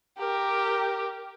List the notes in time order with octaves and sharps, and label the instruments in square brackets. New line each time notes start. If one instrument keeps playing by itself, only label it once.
[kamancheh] G4 A#4